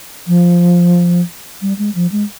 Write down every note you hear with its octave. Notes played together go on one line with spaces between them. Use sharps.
F3
G3
G#3
F3
G#3